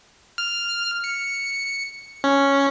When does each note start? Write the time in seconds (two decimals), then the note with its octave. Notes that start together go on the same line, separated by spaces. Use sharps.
0.38 F6
1.04 C#7
2.24 C#4